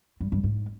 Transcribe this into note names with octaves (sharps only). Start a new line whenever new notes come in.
G2
G2
G#2